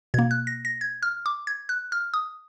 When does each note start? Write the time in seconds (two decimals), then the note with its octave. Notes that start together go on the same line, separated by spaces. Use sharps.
0.14 B2 A#3 G#6
0.31 F#6
0.47 A#6
0.65 A#6
0.81 G#6
1.03 F6
1.26 D6
1.47 G#6
1.69 F#6
1.92 F6
2.14 D#6